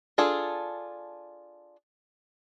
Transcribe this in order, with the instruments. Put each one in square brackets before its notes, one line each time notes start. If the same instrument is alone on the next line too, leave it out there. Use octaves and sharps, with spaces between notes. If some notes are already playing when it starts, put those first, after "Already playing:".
[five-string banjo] D4 F4 G#4 A4